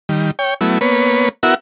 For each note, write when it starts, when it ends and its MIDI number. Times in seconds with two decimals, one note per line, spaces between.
0.09 0.31 51
0.09 0.31 55
0.39 0.54 73
0.39 0.54 79
0.61 0.78 54
0.61 0.78 57
0.61 0.78 59
0.61 0.78 64
0.81 1.29 58
0.81 1.29 59
0.81 1.29 71
0.81 1.29 73
1.43 1.54 59
1.43 1.54 64
1.43 1.54 66
1.43 1.54 70
1.43 1.54 76
1.43 1.54 78